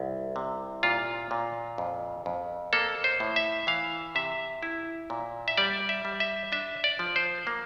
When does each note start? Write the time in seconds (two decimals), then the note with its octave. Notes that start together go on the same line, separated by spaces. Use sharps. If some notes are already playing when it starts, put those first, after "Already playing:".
Already playing: C2
0.36 C3
0.83 A#2 F4
1.31 A#2
1.78 F2
2.26 F2
2.73 A#3 A4
3.04 C5
3.20 A2
3.36 E5
3.67 E3 F5
4.15 C3 E5
4.63 E4
5.10 A#2
5.48 E5
5.57 G3 D5
5.89 E5
6.05 G3
6.20 E5
6.52 D4 E5
6.84 D5
6.99 F3
7.16 C5
7.47 A#3